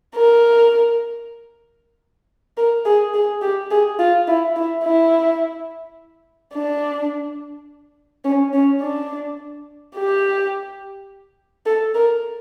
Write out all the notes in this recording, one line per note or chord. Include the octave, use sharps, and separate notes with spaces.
A#4
A#4
G#4
G#4
G4
G#4
F4
E4
E4
E4
D4
C#4
C#4
D4
G4
A4
A#4